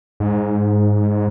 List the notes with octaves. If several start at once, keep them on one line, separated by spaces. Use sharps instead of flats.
G#2